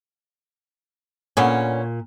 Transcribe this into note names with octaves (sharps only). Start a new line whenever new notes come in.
A#2 D3 B3 C#4